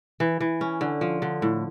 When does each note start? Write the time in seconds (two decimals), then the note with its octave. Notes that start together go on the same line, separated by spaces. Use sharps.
0.20 E3
0.40 E3
0.61 C#4
0.81 D3
1.01 F3
1.22 D3
1.42 A2